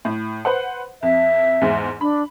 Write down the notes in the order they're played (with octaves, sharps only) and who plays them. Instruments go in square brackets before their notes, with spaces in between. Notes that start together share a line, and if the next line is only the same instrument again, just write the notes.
[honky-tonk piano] A2
B4 C5 F#5
[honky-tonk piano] F2 [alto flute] E5
[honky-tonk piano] E2 G#2
[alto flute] D4 [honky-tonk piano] B5